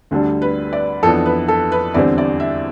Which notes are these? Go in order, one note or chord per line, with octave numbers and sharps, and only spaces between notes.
D2 D3 G3 D4
B4
D5
F2 E3 B3 D4 A4
B4
A4
B4
E2 D3 G3 C4 D5
D5
E5